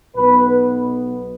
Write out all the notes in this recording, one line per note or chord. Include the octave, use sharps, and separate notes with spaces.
B1 B2 B3 B4